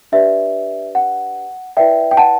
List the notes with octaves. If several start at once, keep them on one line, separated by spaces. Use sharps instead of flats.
D4 G4 B4 D5 E5
F#5
E4 B4 D5 E5 G5
G5
F#5 A5